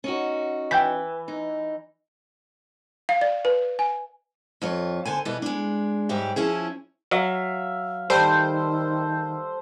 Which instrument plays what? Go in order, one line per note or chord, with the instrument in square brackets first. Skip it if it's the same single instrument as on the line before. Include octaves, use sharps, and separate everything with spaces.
[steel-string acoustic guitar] C#4 D#4 F#4
[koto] E3 [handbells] G5 G6 B6
[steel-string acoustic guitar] D#4
[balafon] F5
D5
B4
G#5
[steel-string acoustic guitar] F2 F4 C#5
D3 C5 G#5
B2 E3 G3 B3
G#3 D4
G#2 F#3 G3 G4 E5
F3 C#4 E4 G#4
[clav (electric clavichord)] F#3 [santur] E5 F5
[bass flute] D#3 [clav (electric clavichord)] G3 [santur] A4 [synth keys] C5